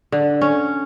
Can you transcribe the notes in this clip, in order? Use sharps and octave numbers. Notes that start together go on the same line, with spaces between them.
D3
C#4